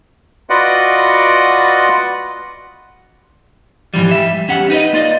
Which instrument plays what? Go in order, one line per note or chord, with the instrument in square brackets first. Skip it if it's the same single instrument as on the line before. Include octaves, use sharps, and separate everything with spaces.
[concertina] F4 F#4 B4 D5 D#5 F#5
[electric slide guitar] G#2 E3 F3 G3
G3 E5
E2 C#4 G4 F#5
D#4 B4 C#5 D#5
A#3 F4 D5 D#5